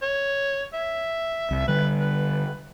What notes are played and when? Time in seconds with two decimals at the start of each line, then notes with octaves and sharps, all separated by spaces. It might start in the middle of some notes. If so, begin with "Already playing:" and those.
0.02 C#5
0.73 E5
1.51 C2
1.68 D3 G3 B4
2.00 B4